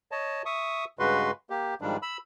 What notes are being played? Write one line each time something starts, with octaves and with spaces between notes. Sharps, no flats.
C#5 D#5 A5
E5 C#6 D#6
G2 C#3 G#3 F#4 B4 C6
A#3 G4
G#2 D#3 F3 G3 D4
B5 E6